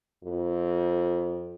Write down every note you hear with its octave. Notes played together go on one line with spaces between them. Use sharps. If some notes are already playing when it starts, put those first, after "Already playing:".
F2